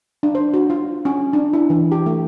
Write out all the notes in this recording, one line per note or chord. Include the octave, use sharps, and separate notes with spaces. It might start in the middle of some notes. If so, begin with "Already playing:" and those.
D4
C5
F#4
F4
C#4
D4
E4
E3
G4
A3